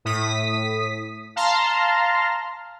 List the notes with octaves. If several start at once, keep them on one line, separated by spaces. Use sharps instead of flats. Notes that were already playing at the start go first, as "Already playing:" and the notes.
A2 D#6 B6
F5 A5 A#5 C6 F6